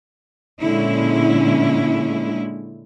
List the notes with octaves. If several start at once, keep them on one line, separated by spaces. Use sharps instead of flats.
A#2 D3 G#3 C#4 E4